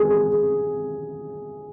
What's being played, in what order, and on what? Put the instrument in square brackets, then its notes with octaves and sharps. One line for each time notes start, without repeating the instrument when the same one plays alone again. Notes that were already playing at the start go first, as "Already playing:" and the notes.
Already playing: [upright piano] G#4